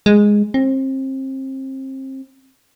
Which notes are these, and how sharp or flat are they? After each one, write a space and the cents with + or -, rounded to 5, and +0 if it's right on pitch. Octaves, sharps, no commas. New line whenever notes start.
G#3 -5
C4 +30